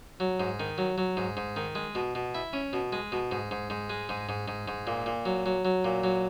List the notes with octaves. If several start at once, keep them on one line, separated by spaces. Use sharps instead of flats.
F#3
G#2
D#3
F#3
F#3
G#2
G#2
D#3
G#3
B2
B2
E4
C#4
B2
G#3
B2
G#2
G#2
G#2
G#3
G#2
G#2
G#2
G#2
A#2
A#2
F#3
F#3
F#3
A#2
F#3